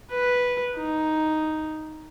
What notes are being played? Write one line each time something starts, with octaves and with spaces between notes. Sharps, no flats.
B4
D#4